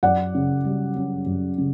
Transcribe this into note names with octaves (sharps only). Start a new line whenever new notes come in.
F#2 D5 F#5
C#3
G3
C#4
F#2
C#3